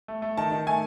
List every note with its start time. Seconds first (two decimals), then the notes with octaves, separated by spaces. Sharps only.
0.08 A3
0.22 A3
0.37 D#3 A5
0.52 D#3
0.67 A3 G#5